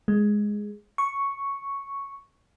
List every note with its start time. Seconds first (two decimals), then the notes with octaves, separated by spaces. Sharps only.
0.08 G#3
0.98 C#6